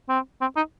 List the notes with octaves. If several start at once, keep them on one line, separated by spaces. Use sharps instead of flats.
C4
C4
D#4